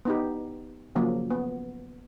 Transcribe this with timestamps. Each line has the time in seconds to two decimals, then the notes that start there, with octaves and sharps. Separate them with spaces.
0.05 B3 D#4 G4
0.95 C#3 F3 F#3 A#3
1.31 B3